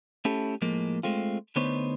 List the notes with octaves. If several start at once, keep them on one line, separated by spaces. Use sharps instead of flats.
A3 C#4 E4 G4 A4
A2 F3 G#3 A#3
G#3 A3 C4 F4
D3 A3 B3 D#4 C5 C#5